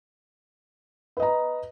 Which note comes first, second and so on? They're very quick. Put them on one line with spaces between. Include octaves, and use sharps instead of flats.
B4 D#5 A#5